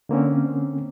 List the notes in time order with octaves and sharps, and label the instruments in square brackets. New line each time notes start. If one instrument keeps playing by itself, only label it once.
[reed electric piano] D3 A#3 C4 C#4